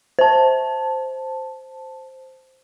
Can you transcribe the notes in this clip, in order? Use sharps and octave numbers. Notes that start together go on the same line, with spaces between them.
C5 A5